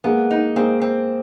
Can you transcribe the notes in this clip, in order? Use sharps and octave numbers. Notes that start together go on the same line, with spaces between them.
G#3 A#3 B3
D#4
G#3 A#3 C4
C4